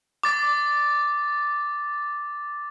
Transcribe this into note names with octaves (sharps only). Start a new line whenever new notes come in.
D6 A6